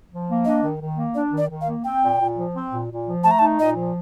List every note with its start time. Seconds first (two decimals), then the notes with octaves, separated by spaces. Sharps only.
0.10 F3
0.28 A#3
0.45 D4 D#5
0.62 D#3
0.80 D#3
0.97 A#3
1.14 D4 D5
1.32 D#3
1.38 D5
1.49 D#3
1.61 F5
1.67 A#3
1.84 C4 G5
2.02 A#2
2.20 A#2
2.37 F3
2.54 C4
2.72 A#2
2.89 A#2
3.07 F3
3.24 A3 A5
3.31 A#5
3.39 D#4 A5
3.59 A#2 D#5
3.76 F3